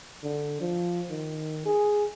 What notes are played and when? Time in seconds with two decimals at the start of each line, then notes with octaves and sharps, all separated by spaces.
0.24 D3
0.61 F3
1.10 D#3
1.66 G#4